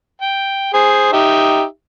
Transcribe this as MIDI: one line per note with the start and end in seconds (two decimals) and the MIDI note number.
0.22 0.72 79
0.74 1.10 68
0.74 1.10 72
1.13 1.63 63
1.13 1.63 67
1.13 1.63 76